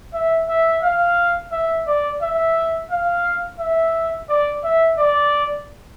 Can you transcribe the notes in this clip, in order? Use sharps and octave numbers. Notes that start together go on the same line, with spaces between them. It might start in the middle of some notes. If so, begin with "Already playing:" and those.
E5
E5
F5
E5
D5
E5
F5
E5
D5
E5
D5